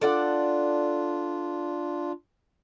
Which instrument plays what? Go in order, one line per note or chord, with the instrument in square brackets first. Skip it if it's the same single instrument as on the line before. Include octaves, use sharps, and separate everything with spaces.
[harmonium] D4 F4 [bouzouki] A4 D5 F#5